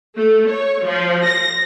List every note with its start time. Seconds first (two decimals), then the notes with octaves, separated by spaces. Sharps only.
0.16 A3
0.48 C#5
0.83 F3
1.25 A#6